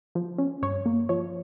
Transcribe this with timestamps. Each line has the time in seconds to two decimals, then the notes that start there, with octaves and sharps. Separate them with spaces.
0.15 F3
0.38 C#4
0.62 G2 C#5
0.86 A#3
1.09 F3 C#5